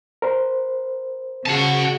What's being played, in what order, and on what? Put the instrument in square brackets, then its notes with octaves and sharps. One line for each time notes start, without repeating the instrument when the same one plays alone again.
[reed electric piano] A#4 C5
[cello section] C#3 F#4 [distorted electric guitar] F#5 A5